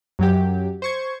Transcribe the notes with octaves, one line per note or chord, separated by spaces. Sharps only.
F#2 F#3 G4
C5 C#6 G#6